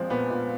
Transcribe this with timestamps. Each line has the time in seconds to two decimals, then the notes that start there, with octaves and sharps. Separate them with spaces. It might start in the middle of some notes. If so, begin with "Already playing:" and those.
Already playing: A#2 F3 G#3 C4
0.10 A#2 B3
0.30 A#2